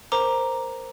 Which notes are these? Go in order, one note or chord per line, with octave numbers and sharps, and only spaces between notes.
A#4 C5 A#5 D6